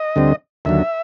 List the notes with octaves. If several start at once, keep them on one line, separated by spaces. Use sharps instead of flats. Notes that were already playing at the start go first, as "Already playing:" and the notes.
Already playing: D#5
D2 D3 G3 C4
D#2 D3 F#3 E5